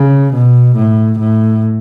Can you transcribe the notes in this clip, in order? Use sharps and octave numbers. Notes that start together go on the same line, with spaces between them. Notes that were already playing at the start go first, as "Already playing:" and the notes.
Already playing: C#3
B2
A2
A2